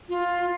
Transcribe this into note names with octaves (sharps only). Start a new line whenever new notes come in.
F4